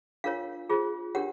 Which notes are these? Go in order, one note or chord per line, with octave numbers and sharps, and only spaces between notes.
D4 F4 A#4 C#5 F5
F4 G#4 C5
D4 G4 A#4 C#5 F#5